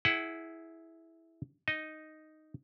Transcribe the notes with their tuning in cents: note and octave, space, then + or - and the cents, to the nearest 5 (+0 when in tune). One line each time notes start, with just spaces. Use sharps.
E4 -5 G#4 +15 F#5 +20
D#4 +0 D#5 +0